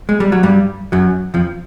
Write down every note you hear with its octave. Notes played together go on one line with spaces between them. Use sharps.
G#3
G3
F#3
G2 G3
F#2 F#3
F2 F3